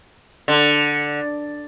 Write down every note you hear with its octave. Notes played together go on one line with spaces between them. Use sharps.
D3